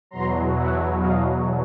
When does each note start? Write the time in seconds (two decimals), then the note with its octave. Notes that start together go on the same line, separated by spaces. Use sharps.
0.11 E2 B2 F#3 A#5 C6
0.55 E5 F#5
0.99 D#5 F5